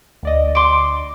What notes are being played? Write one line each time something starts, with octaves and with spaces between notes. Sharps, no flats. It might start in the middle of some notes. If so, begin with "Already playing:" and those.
D2 D5 D#5
C6 D6